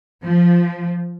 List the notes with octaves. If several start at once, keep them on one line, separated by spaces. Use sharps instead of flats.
F3